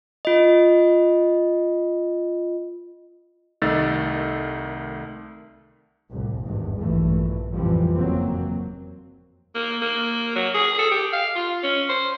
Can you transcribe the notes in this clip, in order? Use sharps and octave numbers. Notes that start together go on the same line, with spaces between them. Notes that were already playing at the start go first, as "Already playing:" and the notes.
F4 D#5
C2 D#3 A3 D#4 E6 A6
C2 F2 A2
G#1 E2 G2
A#1 G2 E3 A3
F2 A2 C3 E3 F3 G3
F#1 F2 F#3 A#3 C4
A#3
A#3
F#3
G#4
A4
G4
F5
F4
C#4
C5